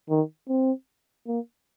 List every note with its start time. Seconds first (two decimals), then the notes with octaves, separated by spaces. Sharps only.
0.10 D#3
0.48 C4
1.27 A#3